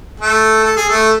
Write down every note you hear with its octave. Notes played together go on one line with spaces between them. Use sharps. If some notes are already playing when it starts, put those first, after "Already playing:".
A3 A4
A4
G#4
A3 A4